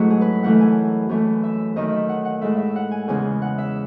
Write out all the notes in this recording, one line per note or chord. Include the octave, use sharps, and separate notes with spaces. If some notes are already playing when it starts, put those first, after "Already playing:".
Already playing: G#2 F#3 A3 E4 F#4
G#4
B4
F#2 E3 A3 F#5
G#5
F#2 E3 A3
E5
F#2 D#3 F#3 A3 D#5
E5
F#5
F#5
A2 G#3 E5
E5
F#5
G#5
E2 C#3 G#3 G#5
F#5
E5